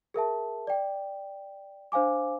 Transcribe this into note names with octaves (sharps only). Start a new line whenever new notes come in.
G#4 A#4 E5 A5
D5 G5
D4 C5 F5 G#5 D6